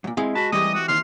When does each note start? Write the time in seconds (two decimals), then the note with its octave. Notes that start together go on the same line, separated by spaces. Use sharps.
0.04 F#2 A#2
0.17 G#3 C4 E4 G#4 F5
0.35 F#4 A5 B5
0.52 E3 G3 A3 C4 G4 D#5 D#6
0.75 F#4
0.88 D#2 D#3 C6 F6